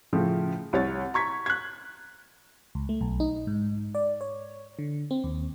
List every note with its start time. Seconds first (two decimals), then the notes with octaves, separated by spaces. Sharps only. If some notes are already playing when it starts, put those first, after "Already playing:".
0.13 A2 C#3 F3
0.73 C2 C#5 A6
1.14 A#5 C#6 G#6 B6
1.46 F#6 G#6
2.75 C#2
2.89 A3
3.01 B1
3.20 D#4
3.47 G#2
3.95 D5
4.21 C#5
4.79 D3
5.11 C4
5.24 D#2